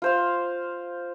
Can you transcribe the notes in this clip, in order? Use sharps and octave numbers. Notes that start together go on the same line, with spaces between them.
F4 C5 F5